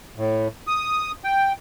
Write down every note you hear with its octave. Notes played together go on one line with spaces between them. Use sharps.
A2
D#6
G5